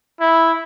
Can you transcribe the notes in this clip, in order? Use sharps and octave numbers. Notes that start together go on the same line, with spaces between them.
E4